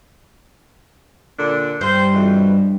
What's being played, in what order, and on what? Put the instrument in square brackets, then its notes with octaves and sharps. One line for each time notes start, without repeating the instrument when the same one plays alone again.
[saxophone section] A#2 D3 D4
[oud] G2 [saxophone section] C5
[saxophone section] F2 B2 E3